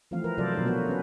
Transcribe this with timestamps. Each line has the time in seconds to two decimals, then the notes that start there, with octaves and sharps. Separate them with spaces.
0.11 E3 F3 A3 C4 F5
0.24 A#4 B4
0.38 C3 F#3 F4 A4 C5 D5
0.54 B2 D3 F#3 D#4 A#4
0.65 A#3 B3 F#4 B4
0.88 C#4 B4